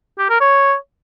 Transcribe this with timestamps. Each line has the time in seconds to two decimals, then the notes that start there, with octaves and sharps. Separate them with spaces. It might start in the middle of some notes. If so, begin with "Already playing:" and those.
0.19 G4
0.30 A#4
0.41 C#5